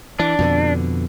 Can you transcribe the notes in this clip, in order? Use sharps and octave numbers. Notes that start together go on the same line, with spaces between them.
E3 D4
F2 B2 D3